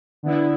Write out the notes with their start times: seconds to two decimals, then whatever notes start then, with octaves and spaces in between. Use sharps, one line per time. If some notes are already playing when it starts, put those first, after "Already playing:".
0.23 D3 B3 E4